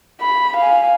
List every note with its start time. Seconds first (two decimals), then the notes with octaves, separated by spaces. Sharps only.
0.21 B5
0.57 F5 G#5